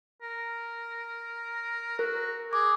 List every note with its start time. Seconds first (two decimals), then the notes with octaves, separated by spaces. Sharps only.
0.22 A#4
1.99 F#4 A#4
2.53 G#4 D6